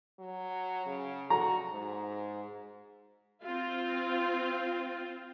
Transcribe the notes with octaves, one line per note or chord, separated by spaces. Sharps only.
F#3
C#3
F#4 A#5
G#2
C4 F4